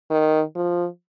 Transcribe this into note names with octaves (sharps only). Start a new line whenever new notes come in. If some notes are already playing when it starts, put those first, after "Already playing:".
D#3
F3